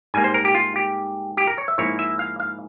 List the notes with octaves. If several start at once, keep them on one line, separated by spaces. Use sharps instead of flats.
G#2 G3 A#3 G#5
C5
A#4
G4
F4
G4
G4
A#4
C#5
E5
G#2 F3 A#3 E4 C#5
E5
F5
F5